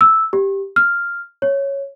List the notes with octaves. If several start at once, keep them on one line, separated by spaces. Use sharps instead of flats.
E6
G4
F6
C#5